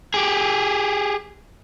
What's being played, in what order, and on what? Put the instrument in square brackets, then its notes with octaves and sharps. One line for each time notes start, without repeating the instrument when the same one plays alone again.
[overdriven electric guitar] G4 G#4